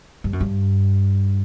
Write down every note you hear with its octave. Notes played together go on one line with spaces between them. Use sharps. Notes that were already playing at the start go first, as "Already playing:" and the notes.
G2
F#2
G2